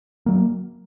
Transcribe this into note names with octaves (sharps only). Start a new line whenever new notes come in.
F#3 A#3